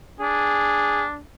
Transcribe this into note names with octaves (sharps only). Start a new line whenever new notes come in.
D4 G#4